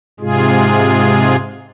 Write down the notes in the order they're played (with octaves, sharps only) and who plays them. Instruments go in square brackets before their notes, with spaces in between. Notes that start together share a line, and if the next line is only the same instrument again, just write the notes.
[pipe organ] G#2 C3 G#3 F4 G#4